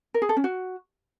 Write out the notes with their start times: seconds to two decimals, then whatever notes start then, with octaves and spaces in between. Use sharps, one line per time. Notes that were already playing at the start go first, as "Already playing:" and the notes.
0.14 A#4
0.22 G#4
0.29 A4
0.37 C#4
0.44 F#4